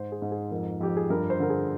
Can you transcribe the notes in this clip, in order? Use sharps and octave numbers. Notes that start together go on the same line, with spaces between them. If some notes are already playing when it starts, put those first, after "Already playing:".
Already playing: G#2 C5
G#4
G#2
G#4
F2 A#4
F2 G4
G#4
G2 A#4
C5
D3 A#4
G#4